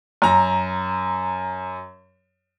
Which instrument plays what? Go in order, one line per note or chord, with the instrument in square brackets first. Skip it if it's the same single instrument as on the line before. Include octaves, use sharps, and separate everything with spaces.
[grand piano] F#2 A#5